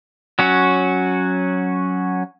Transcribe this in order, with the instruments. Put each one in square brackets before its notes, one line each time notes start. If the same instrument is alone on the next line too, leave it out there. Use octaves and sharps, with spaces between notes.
[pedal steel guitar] F#3 C#4 F#4